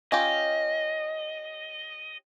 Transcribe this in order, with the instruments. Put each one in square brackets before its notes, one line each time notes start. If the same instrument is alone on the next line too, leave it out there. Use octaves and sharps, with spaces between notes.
[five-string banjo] C#4 F4 G4 [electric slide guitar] D#5